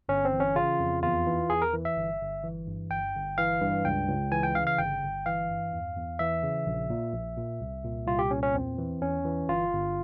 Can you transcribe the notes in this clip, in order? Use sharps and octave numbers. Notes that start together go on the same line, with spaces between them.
G1 C#4
C4
E3
C#4
C#3 F4
F2
E2 F4
E3
E2 G#4
A#4
E3
E5
G1
G1
E3
G2
G1 G5
G1
E3 F5
G2
C#2 G5
C#2
E3 G#5
G5
C#3 F5
F5
G1 G5
G1
E3 F5
G2
E2
E2
E3 E5
C#3
A#1
A#2
A#1
A#2
C2
A#2
C2 F4
G4
A#2 C#4
C#4
E2 C4
E3
E2 C#4
E3
G1 F4
G1